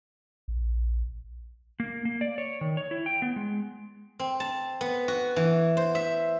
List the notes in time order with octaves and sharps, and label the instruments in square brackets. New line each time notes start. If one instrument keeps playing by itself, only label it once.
[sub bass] A#1
[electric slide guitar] A#3
A#3
D5
C#5
D#3
C#5
E4
G5
B3
G#3
[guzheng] C4
A5
B3
F#4
E3
C5
E5